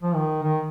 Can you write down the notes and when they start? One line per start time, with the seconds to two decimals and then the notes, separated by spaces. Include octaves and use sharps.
0.03 F3
0.15 D#3
0.43 D#3